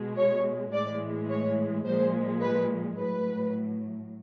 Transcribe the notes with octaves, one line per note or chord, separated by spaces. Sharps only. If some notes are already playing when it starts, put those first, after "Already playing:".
Already playing: B2 G#3
C#5
A2 E3 G#3 D5
C#5
A#2 F3 G#3 C5
B4
A2 F#3 B4